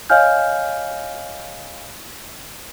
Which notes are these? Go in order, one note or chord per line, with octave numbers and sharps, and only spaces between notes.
C#5 D#5 F5 G#5 F6 G6